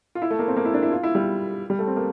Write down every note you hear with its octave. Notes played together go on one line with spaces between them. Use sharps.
F4
E4
A3
A#3
C4
A#3
E4
D4
E4
F4
E4
G3
G3
A3
C4
A#3